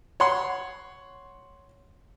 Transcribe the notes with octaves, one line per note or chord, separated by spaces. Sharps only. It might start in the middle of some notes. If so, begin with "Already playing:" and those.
C#5 F#5 C6